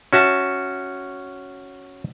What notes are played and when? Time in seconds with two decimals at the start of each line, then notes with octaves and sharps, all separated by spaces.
0.13 C#4 F#4 E5 A5